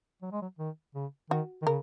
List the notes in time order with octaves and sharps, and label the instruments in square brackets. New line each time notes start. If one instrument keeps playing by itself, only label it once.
[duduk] F#3
G#3
F#3
D#3
C#3
[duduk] D#3 [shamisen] F#4
[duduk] D#3
[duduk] C#3 [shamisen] A#4